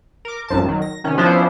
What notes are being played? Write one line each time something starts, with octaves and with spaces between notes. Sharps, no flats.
A#4 D6
A1 F#2 A5
D#3 F#3
A#6
C3 D#3 C#4
F3 B3 C#4 D4 E4 C5